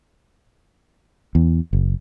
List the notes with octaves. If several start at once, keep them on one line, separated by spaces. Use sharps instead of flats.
E2
F#1